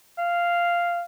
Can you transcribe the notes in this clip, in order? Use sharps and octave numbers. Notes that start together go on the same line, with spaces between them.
F5